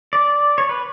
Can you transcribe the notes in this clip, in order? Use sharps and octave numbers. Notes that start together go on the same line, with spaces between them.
D5
C#5
B4